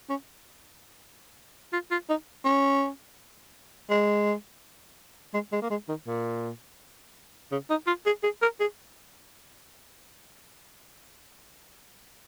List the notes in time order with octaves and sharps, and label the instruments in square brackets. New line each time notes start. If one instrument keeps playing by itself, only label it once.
[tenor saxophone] C#4
F4
F4
D#4
C#4
G#3
G#3
G#3
A#3
G#3
D#3
A#2
C#3
D#4
F4
G#4
G#4
A#4
G#4